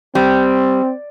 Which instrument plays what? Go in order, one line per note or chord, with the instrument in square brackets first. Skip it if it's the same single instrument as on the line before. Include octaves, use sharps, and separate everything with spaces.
[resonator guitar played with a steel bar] G3 [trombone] C4